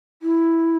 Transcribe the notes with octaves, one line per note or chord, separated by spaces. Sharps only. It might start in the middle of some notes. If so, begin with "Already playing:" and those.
E4